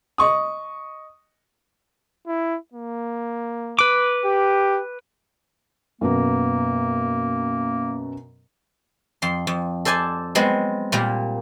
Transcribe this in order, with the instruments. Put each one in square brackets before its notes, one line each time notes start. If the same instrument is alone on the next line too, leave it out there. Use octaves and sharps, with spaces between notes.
[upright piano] D#5 C#6 D#6
[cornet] E4
A#3
[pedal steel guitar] B4 D6
[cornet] G4
[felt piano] F#2 B2 A#5 [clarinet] A#3
[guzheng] F2 C6
F2
A4 C5 D5 G#5 A5
F#3 G#3 B3 C4
A#2 G3 A#3